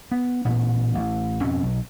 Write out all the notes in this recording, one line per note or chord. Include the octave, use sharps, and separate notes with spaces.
B3
A1 A#2 B3
A1
F2 B2 C4 C#4
B1